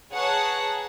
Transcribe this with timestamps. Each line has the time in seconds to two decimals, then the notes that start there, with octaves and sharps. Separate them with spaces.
0.12 G#4 B4 C#5 F#5 A5 A#5